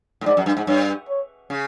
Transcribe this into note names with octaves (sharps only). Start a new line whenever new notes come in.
A2
G#2 D5
F#2
G2
G#2
G2 C#5
C#5
C#3